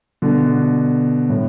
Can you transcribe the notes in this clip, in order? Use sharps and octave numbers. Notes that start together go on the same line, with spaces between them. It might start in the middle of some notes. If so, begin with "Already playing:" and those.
B2 D3
A2